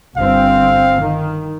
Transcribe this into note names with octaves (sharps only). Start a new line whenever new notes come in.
G1 C4 F5
D#3